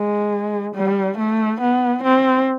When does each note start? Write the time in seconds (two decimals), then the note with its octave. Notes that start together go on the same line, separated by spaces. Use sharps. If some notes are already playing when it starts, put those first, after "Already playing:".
Already playing: G#3
0.75 G3
1.18 A3
1.60 B3
2.03 C4